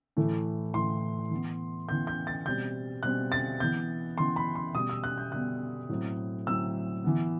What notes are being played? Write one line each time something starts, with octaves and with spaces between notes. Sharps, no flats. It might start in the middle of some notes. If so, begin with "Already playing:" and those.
A2 E3 A3
A2 E3 A3 C6
E3 B3
E3 B3 G6
G6
A6
B2 G3 C4 G6
B2 G3 C4 F#6
A6
E3 B3 G6
E3 B3 C6
B5
C6
B2 G3 B3 D#6
E6
F#6
G6
B2 G3 B3 F#6
A2 F#3 C4
A2 F#3 C4 E6
E3 B3